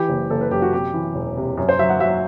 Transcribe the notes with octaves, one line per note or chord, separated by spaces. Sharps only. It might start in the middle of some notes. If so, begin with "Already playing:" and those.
Already playing: E3 G4
F#1
F#1 A4
B4
F#2 G4
F#4
C3 G4
E3
E1
C3
F#2
C5
F#3 E5
F#5
F#3 E5